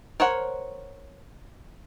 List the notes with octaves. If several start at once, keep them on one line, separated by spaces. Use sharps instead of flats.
A#4 C5 C#5 F#5